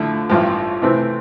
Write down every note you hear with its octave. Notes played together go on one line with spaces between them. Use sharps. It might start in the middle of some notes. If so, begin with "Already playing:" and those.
Already playing: D3 F3 A3 E4
A1 G2 F3
C3 E3 A3 C4